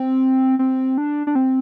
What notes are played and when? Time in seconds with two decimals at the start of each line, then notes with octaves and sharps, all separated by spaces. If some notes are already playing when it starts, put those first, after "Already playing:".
Already playing: C4
0.59 C4
0.98 D4
1.27 D4
1.35 C4